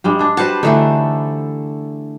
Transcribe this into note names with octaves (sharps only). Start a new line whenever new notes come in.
G2 G3 G#3
D4 G#4
G3 F#4 B4 C5 A5
D3 E3 A3 D4 D#4